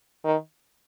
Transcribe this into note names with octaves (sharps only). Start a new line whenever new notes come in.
D#3